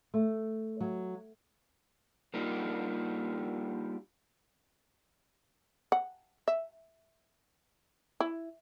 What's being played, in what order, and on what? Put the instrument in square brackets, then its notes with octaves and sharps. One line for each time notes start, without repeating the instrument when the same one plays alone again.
[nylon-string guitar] A3
F#3
[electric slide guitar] G3 A#3 D4 D#4 F4 G4
[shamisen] F#5
E5
E4